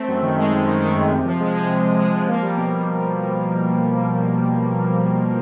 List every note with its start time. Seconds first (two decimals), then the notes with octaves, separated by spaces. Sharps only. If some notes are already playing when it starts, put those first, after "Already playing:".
Already playing: A3 C4
0.08 F#2
0.22 D#3
0.37 G#3
0.52 D#3
0.67 D#3
0.81 D#3
0.96 F#2
1.11 C3
1.25 F3
1.40 G#3
1.54 G#3
1.69 C3
1.85 C3
1.98 G#3
2.14 F3
2.28 A#3
2.42 G3
2.57 B2